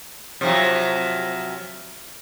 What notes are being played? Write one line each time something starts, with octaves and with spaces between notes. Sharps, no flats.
C3 F3 F#3